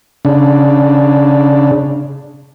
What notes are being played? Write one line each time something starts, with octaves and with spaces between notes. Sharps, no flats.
C#3 D4